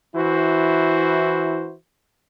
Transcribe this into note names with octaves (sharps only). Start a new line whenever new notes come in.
E3 E4 F#4 C5